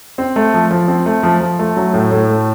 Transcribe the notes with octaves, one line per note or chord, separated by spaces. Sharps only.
C4
A3
F3
F3
C4
A3
F3
F3
A3
F#3
A2
A2
A3